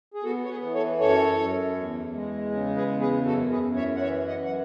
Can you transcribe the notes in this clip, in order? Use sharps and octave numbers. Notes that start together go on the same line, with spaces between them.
G#4
B3 F#4 A4
C#5
G#4 B4
E3
A4 C#5
F#2 A4 C#5
F#2
E2
G#3
C#3
G#4 B4
E2
G#4 B4
F#2 F#4 A4
G#4 B4
F#2
C#5 E5
F#5
E3 C#5 E5
D#5 F#5
F#2
F#5